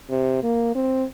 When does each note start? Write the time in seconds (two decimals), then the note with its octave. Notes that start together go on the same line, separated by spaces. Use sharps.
0.10 C3
0.43 A#3
0.75 C4